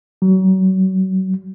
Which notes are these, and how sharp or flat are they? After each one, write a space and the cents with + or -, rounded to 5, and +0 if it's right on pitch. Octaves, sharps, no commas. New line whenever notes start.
F#3 +30